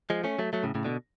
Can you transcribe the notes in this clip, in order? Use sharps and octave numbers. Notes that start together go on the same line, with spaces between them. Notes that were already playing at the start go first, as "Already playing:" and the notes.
F3 G#3
A3 C#4
F#3 A3
F#3 A3
A2 C#3
A2 C#3
B2 D3